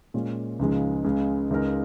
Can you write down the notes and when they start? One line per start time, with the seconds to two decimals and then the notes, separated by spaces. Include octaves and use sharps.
0.14 A#2 G#3 C#4 F4
0.59 C#2 C#3 F3 G#3 D#4
1.04 C#2 C#3 G#3
1.50 C#2 C#3 G#3 D#4 A#4